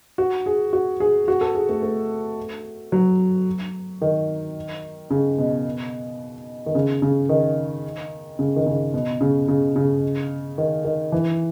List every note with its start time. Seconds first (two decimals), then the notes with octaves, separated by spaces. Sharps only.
0.18 F#4
0.46 G#4
0.73 F#4
1.00 G#4
1.28 F#4
1.41 A4
1.55 G#4
1.69 A3
1.82 A3
2.92 F#3
4.02 D#3
5.11 C#3
5.38 B2
6.66 D#3
6.75 C#3
7.02 C#3
7.29 D#3
8.39 C#3
8.56 D#3
8.66 C#3
8.94 B2
9.21 C#3
9.48 C#3
9.76 C#3
10.58 D#3
10.85 D#3
11.12 E3